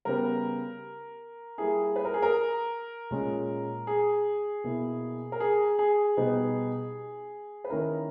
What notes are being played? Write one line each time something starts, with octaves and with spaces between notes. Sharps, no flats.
C#3 G3 B3 A#4
G3 A#3 E4 G#4
B4
A#4
G#4
A#4
A#2 G#3 C#4
G#4
B2 A#3 E4
A#4
G#4
G#4
B2 G3 B3 D#4
B4
D#3 A#3 C#4 E4 A#4